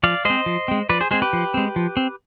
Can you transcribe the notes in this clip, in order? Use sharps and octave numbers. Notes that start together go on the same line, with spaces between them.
F3 D5 F5
G#3 C4 C5 D#5
F3
G#3 C4
F3 B4 D5
G#4 C5
G#3 C4 G#4 C5
G4 B4
F3
G#3 C4
F3
C4